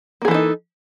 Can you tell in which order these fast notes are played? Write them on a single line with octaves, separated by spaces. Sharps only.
A#3 G#4 E3 A4 D#4